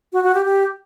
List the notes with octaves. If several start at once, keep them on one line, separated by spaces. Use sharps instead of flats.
F#4
F#4
G4
G4